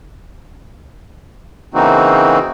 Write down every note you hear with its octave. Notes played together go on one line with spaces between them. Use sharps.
C#3 E3 A#3 C4 D#4 F#4